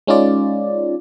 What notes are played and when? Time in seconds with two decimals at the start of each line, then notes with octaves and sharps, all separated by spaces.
0.07 G#3 C#4 D#4 F4 D5